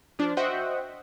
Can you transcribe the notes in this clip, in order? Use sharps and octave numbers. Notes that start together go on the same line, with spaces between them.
F3 D4
F#4 C5 D#5 E5 F#5 G5